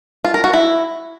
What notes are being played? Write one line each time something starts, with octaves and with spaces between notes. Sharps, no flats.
F4
A#4
F#4
E4